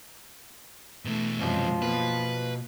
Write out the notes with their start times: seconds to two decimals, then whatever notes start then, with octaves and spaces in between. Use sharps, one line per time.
1.05 B2 E3 A3
1.40 F#2 C3 F3 G#3
1.82 B2 A#3 B4